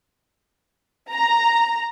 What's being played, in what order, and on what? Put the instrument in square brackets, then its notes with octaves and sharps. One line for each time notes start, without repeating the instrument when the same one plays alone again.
[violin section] A#5